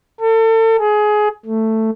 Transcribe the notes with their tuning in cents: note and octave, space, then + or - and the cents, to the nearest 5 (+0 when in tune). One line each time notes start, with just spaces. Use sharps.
A4 +35
G#4 +20
A3 +10